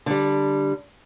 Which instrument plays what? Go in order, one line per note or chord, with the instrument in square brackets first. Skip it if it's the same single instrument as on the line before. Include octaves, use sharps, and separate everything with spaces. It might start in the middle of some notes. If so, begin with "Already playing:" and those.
[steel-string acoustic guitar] D3 G3